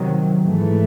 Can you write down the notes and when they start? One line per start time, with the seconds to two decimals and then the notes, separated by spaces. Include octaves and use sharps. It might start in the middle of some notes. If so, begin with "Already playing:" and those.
Already playing: C3 D#3 F#3
0.43 G#2 E3 A3